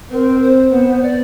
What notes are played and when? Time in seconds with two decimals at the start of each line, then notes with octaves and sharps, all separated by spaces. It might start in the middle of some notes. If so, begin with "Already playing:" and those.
0.12 C4 A#4
0.42 C5
0.72 B3
1.02 D5